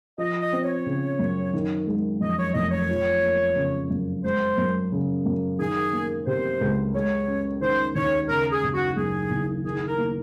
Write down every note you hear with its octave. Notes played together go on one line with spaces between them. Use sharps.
F3 D#5
D#5
C4
C#5
C#3
F#2
D#3
G#3
F2 D#5
C#5
F1 D#5
C#5
F3
A#3
C#3
F#2
G#3 C5
F#2
C#3
F#2
D#3 G#4
A#3
C3 C5
C#2
G#3 C#5
C#4
D#3 C5
D#2 C#5
C#3 A#4
G#4
F#1
F#4
F#2 G#4
F#1
D#3 G#4
A#4
A#3